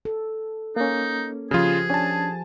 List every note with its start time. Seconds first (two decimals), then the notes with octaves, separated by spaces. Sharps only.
0.05 A4
0.76 A#3 C#4 D#4
1.51 C#3 F3 F4 G4 G#4
1.90 C#4 D4 G#5 A5